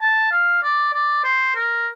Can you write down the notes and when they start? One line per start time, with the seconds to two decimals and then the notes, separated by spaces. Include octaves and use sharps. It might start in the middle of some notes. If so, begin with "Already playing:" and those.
0.01 A5
0.31 F5
0.63 D5
0.94 D5
1.24 C5
1.55 A#4